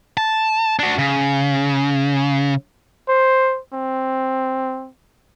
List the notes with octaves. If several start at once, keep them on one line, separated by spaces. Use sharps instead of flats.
A5
D4 F#4
C#3
C5
C4